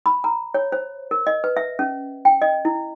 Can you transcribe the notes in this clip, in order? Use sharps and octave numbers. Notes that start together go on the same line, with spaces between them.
B5
A#5
C#5
C5
A#4
D#5
B4
E5
C#4
G5
D#5
E4